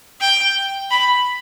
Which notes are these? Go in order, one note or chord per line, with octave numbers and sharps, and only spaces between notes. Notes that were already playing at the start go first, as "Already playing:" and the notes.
G5
B5